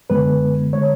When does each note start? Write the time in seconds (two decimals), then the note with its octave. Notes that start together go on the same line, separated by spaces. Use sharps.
0.10 F#2 D3 G#3 B3 B4
0.73 D3 G#3 C#5